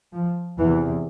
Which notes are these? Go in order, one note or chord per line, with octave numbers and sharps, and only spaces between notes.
F3
E2 C3 E3